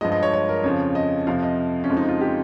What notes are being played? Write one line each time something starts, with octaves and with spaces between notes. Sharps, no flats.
G2 F3 G#3 D#5
D#5
C#5
C#5
A#4
F2 C#3 F3 C#5
D#5
F2 C3 F3 F5
D#5
C#4
F2 C#3 F3 G#3
D#4
F4
G4